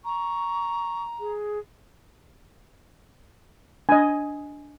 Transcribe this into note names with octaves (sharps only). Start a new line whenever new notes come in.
A#5 C#6
G#4
D4 D#5 G#5